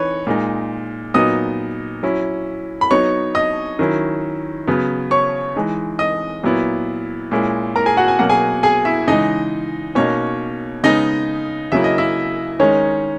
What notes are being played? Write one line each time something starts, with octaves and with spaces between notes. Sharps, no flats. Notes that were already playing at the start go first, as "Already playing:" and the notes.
Already playing: E3 D#4 B4 C#5
A#2 G#3 D#4
A#2 F#3 B3 D#4 D#5 D#6
F#3 C#4 E4
B5
F#3 B3 D#4 C#5 C#6
D#5 D#6
D#3 F#3 C#4 E4
C#3 F#3 B3
C#5 C#6
E3 G#3 D#4
D#5 D#6
A#2 F#3 B3 E4
A#2 G#3 C#4 E4
A#4 A#5
G#4 G#5
F#4 F#5
G#5
B2 F#3 A#3 F#5
G#4 G#5
G#4 G#5
E4 E5
C#3 E3 G#3 D#4 D#5
B2 A#3 C#4 D#4 C#5
C#3 G#3 B3 D#4 D#5
C#3 F#3 A#3 E4 E5
D#5
E4 E5
D#3 G#3 C#4 D#4 C#5